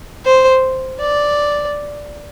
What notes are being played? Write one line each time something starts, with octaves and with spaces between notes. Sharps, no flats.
C5
D5